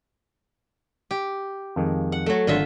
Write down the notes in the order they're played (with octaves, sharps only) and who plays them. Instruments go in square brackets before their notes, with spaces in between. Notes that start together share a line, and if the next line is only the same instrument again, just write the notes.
[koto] G4
[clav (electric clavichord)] F2 D#3 G#3
[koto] F#5
F#3 A3
[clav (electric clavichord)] G#1 [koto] D3 F4 E5